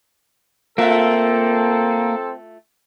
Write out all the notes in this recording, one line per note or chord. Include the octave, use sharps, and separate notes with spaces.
A3 A#3 C4 F4 A4 E5